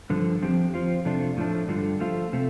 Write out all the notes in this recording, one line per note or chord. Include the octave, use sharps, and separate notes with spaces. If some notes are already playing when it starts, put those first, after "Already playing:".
G2 D3 F3
F2 F3 C4 G4
F3 C4 F4
F2 C3 A3 D4 F4
A2 F3 A3 D4
G2 D3 G3 F4
F3 A3 F4
C3 A3